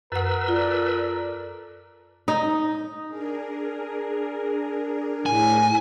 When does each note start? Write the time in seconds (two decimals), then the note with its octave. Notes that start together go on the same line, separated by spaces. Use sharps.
0.12 F#2 A#4 B4 F#5 E6
0.48 F4 A4 D5
2.28 D#4
3.08 D4 G#4 A#4
5.26 A2 G#5